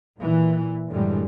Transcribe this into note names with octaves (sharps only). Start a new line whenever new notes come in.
A#2 E3
F#2 A2 D3 E3 G3 G#3